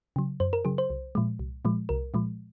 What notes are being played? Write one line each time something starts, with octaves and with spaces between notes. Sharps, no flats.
C#3 F#3
F#2 C5
A#4
C#3 F#3 G#4
C5
C2
A#2 F3 G#3
C2
A#2 F3 G#3
C2 A#4
A#2 F3 G#3